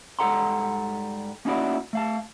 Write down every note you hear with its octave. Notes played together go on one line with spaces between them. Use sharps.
G#2 G3 A4 F#5 A#5 C6
A#3 C#4 D#4 E4 F#4 D5
A3 F5 A5